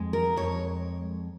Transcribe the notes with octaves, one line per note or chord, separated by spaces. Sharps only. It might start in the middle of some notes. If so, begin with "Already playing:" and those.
Already playing: F2 G#3
A#4
F2 C#5